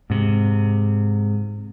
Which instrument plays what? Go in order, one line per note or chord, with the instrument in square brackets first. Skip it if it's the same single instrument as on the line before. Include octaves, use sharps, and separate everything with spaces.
[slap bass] G#2 C3